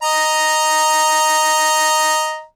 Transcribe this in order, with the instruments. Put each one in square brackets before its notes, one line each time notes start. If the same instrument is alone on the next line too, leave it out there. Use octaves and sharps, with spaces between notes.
[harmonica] D#5 A#5